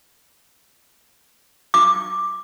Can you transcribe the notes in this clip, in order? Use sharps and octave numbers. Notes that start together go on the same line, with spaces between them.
D6